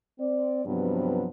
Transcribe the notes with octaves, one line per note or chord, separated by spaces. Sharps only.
C4 D5
G2 C3 F3 F#3 B3 C4